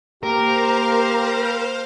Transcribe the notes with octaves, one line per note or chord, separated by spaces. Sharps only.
A#3 G4 A#4 C5 F5